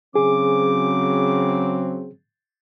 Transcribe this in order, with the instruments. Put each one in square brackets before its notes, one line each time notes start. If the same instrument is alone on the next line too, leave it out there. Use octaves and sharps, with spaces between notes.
[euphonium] C#3 [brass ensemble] F#3 C4 [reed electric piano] G#4 [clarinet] D6